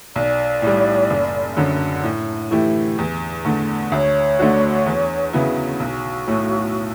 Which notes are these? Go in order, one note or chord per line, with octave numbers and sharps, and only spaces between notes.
B1 D5
A2 G3
F#1
F#2 D3 F#3
A2
E3 A3 E4 G4
E2
D3 A3
D2 C#5
D3 A3 D4 F#4
E2
C#3 F#3 B3 E4
B1 F#4
A2 F#3 A3